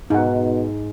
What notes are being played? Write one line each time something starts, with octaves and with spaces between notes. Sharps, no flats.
G#2 B2 D#4 F#5